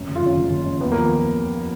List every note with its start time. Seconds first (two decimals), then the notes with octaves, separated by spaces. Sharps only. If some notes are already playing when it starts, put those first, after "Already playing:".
Already playing: F1 F#2
0.08 F#1
0.15 F4
0.22 F#1 C#4
0.37 F#1
0.51 F#1
0.66 F#2
0.80 D#2 B3
0.92 F3 A#3